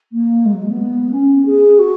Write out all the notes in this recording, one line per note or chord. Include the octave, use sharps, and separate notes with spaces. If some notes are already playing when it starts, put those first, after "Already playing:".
A#3
G#3
F#3
G#3
B3
C#4
G#4
F#4